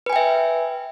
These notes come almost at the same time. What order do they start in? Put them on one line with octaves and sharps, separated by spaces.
B4 G#5 G5 E5